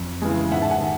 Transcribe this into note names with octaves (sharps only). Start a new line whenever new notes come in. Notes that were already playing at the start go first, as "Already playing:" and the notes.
Already playing: F2
C#3 E3 G#3
G#2 E5 F#5
A5
F#5 G#5
D#3